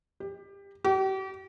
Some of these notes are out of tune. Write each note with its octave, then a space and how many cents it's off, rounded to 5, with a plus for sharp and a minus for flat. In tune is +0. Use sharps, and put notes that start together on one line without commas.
G4 +20
G4 -40